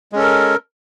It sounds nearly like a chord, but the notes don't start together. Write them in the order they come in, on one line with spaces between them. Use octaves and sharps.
G#3 C#4 A4 A#4